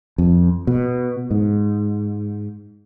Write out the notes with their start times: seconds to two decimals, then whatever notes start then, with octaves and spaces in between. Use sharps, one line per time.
0.18 F2
0.67 B2
1.31 G#2